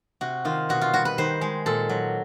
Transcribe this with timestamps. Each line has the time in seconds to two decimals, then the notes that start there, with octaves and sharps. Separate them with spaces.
0.21 C3 F#4
0.45 D#3 F4
0.69 B2 F#4
0.81 F4
0.94 G3 F#4
1.05 B4
1.18 D#3 C5
1.41 G#3
1.66 A#2 A4
1.89 F#3